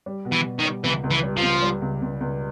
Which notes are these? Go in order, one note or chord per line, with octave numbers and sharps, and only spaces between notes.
G3
B2
E3
B2
D#3
G3
C#2 E3
C#2
E3
G3
F3
C#2
G3
C#2
C#2
C#2